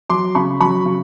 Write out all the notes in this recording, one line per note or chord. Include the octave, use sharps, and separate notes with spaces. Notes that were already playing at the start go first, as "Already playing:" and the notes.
F#3 C6 D6
C#3 B5 C#6
F#3 B5 C#6
C#3